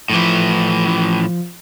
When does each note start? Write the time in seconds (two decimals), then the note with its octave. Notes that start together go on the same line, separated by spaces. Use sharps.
0.10 A2 E3 F3